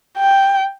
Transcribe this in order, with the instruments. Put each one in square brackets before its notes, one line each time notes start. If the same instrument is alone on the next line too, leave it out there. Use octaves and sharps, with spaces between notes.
[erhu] G5